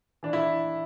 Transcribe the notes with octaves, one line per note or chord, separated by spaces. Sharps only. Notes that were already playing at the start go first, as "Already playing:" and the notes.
E3 D4
E4